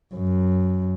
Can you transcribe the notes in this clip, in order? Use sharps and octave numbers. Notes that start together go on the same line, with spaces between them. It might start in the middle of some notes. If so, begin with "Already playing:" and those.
F#2